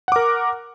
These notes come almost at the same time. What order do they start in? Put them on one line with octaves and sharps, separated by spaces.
F#5 D6 A#4